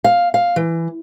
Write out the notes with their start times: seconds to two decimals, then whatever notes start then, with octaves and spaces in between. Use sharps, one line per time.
0.04 F5
0.34 F5
0.56 E3